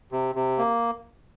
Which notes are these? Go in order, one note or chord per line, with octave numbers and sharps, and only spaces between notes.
C3
C3
A#3